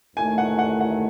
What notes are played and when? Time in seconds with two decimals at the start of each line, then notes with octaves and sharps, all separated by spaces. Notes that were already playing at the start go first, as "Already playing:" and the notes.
0.16 D#2 D#3 A3 E4 G#5
0.38 F#5
0.59 F#5
0.81 F#5